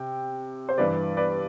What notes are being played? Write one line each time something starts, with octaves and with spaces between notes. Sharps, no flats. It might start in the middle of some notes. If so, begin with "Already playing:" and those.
Already playing: C3 G5
C5
G2 E3 G3 B4 D5
B4 D5